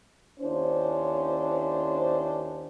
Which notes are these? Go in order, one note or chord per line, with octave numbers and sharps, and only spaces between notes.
D#2 C#4 D4 E4 C5